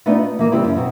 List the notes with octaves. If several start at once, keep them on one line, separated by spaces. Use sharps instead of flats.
A3 B3 D4 D#4 F4 F#4
D#5
E3 A#3
C#3 G3 C4 E4
F#2 C#4
B2 C4 F#4